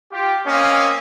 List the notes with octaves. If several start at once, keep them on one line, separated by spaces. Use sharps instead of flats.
F4 G4
A#3 C4 C#4 D#5 F5 G#5